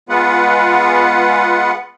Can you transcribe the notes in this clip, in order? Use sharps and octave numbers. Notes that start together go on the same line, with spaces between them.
G#3 B3 F4 B4 F#5